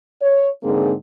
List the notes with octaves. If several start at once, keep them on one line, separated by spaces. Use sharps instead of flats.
C#5
G#2 D3 A#3 C4 D#4 G#4